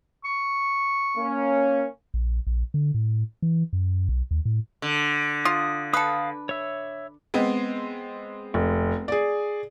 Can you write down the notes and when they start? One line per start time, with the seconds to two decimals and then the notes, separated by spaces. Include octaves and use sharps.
0.25 C#6
1.17 A#3 C#4
2.14 A#1
2.47 A#1
2.74 D3
2.94 A2
3.42 E3
3.73 F#2
4.09 B1
4.31 D#2
4.45 A2
4.82 D3
5.45 F4 D#6
5.93 A4 B4 F5 D#6
6.49 C#5 E5
7.34 G#3 B3 C4
8.54 F1
9.08 G#4 D5